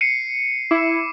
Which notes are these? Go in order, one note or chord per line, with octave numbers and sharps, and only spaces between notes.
C7 C#7 D#7
E4 D6